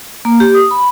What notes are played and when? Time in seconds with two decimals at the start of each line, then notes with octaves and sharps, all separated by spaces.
0.25 A#3
0.40 G4
0.54 D#6
0.71 B5